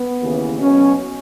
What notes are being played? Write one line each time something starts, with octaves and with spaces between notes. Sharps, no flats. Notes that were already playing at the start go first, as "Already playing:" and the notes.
Already playing: B3
D#2 C#3 E3
B1 B2 C#4